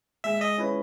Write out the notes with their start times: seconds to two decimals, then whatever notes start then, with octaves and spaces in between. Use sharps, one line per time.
0.24 G#3 E5
0.41 D#5
0.58 C#4 E4 B4